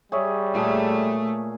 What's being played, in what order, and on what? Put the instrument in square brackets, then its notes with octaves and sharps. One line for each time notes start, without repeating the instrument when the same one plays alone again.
[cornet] G3 [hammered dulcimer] G#4 C#5 E5
[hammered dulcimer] A#2 G#4 [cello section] A3